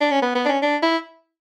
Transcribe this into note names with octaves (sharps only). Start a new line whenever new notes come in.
D4
C#4
B3
B3
D4
C#4
D4
E4